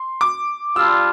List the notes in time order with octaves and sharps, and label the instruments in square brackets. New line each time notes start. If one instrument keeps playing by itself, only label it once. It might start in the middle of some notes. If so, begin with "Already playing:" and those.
Already playing: [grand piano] C6
D6
[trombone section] G3 D4 F4 [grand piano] E6